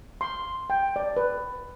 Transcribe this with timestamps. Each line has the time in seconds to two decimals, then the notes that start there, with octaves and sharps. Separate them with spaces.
0.21 C6
0.70 G5
0.96 D5
1.17 B4